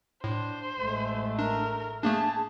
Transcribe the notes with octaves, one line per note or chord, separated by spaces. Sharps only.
A2 D4 C5
A1 G#3 A3
D4 A#4
A3 A#3 D4 G#4 A5